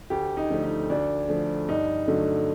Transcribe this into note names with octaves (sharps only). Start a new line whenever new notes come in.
D2 G4
D#4
D3 F3 A3
D#4
D2 D4
D3 F3 A3
G2 D#4
D3 F#3 A3